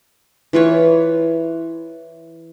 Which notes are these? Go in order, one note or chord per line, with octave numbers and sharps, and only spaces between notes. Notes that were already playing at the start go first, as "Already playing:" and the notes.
E3 F4 B4 C#5